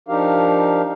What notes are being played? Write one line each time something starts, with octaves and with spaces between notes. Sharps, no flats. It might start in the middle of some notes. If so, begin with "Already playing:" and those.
F3 D4 D#4 G4 A#4 F5